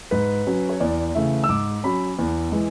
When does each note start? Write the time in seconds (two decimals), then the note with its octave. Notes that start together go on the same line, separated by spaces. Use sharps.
0.11 G#2 B4
0.47 F#3 C#4
0.69 C#5
0.80 E2 D5
1.15 C#3 E3 A3 E5
1.44 E6
1.49 G#2 D6
1.84 F#3 C#4 B5
2.19 E2
2.52 E3 G#3